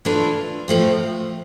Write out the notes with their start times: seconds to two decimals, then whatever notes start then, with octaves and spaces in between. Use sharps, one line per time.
0.05 E3 A3 D4 F4
0.68 A2 F3 A3 C4